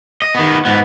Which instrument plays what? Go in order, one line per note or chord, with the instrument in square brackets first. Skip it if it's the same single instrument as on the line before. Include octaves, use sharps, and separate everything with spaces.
[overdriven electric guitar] D#5
D#3 B3
G#2 B3